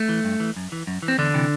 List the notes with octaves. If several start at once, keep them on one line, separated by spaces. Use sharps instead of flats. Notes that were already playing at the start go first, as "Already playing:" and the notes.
Already playing: A3
E3
G2
E3
F#2
E3
F#2
E3
C4
E2 D3 D4
C3 E3